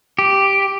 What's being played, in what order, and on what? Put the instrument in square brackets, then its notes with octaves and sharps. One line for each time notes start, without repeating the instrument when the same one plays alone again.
[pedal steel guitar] G4